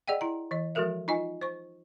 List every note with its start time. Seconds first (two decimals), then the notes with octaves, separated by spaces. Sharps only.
0.08 G#4 D5 D#5 F#5 G5
0.21 E4 A#5
0.51 E3 D#5
0.75 F3 G#3 F#4 A4 A#4 E5
1.08 D#4 F4 D#5 G#5
1.41 C5 C#6